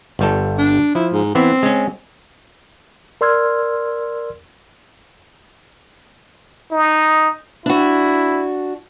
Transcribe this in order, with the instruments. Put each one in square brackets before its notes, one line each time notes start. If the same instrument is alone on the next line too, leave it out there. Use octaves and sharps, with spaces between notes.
[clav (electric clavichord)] G1 G3 A4
[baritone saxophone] D4
[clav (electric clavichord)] F3 [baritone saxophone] E4
[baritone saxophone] G#2
[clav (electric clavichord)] E3 B3 E4 [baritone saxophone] C4
[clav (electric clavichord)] G#3 C#4
[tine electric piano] A#4 D5 C6 E6 F6 G#6
[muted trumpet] D#4
[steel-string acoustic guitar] D4 F#4 [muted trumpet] E4